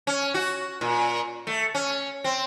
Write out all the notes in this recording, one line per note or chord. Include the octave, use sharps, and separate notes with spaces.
C#4
F#4
A#2
A3
C#4
C4